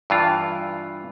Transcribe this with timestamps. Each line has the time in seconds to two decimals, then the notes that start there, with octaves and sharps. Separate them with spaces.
0.10 G2 E3 F4